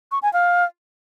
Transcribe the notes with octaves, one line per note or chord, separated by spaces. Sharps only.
C#6
G#5
F5